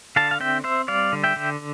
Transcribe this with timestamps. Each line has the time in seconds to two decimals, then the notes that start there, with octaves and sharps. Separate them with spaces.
0.16 D3 F5 A5
0.31 F5
0.40 C4 E5 G5
0.64 C4 C5 E5
0.88 G3 D5 F5
1.12 D3
1.24 E5 G5
1.36 D3